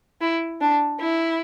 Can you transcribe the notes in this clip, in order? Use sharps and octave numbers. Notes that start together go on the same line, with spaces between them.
E4
D4
E4